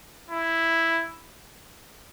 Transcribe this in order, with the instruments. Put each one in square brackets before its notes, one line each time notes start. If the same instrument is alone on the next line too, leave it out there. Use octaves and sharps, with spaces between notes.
[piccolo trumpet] E4